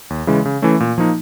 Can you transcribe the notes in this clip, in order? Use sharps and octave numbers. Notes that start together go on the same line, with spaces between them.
D#2
C#3 E3 G#3
C#3
E3 A3 C#4
A#2
F3 A#3 D#4